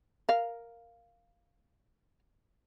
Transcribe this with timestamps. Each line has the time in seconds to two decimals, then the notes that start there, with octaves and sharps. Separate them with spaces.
0.29 A#4 F5